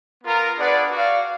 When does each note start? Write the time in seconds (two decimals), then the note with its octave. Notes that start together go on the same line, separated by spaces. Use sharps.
0.22 B3 F4 A#4
0.56 D4 G#4 B4 D5 F#5
0.90 F#4 D5 F5